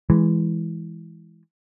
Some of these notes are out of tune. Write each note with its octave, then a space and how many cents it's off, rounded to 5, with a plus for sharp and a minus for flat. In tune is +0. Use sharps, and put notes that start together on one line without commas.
E3 +0 G#3 +0